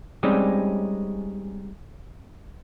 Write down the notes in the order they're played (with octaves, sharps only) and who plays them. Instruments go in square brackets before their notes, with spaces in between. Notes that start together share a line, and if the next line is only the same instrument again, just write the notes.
[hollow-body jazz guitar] G3 G#3 C4 C#4 D#4 G4